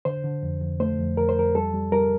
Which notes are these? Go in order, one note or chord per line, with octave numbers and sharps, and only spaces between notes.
D3 C5
D3
F2
F2
A3 C5
F2
F2 A#4
C5
F2 A#4
G3 A4
G3
G3 A#4